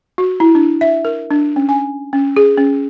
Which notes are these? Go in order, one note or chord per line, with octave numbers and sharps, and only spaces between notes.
F#4
E4
D4
E5
A#4
D4
C#4
G#5
C#4
G#4
C#4